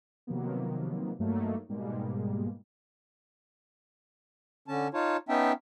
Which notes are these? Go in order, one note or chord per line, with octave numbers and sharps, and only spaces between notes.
C3 D#3 F3 F#3 A#3 B3
G2 F#3 A3 A#3 D#4
G#2 B2 G3 G#3 A#3
D3 C#4 A5
D#4 F4 C#5 A5
B3 C#4 D#4 E5 G5 A5